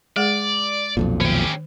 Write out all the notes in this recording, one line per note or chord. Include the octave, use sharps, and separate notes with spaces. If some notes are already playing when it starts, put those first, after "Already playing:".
G#3 G#4 D5 F#5
B1 F2 A#2
D#3 C#4 G4